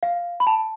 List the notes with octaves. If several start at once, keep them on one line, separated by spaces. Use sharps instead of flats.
F5
B5
A5